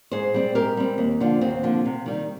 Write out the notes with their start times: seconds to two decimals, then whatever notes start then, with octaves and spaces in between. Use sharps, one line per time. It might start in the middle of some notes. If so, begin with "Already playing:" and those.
0.11 G#2 G#4 C5
0.34 G3 C4
0.55 G#2 G4 A#4
0.77 G3 C4
0.98 D#2
1.20 D3 F3 A#3
1.41 D#2 C4
1.63 D3 F3 A#3
1.85 C3
2.06 D#3 G3